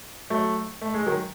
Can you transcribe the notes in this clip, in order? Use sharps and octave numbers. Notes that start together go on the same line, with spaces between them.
F#3 A3
A3
G#3
D#3 F#3